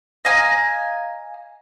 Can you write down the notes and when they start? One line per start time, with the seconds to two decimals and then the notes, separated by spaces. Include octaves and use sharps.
0.25 D#5 F5 G#5 A#5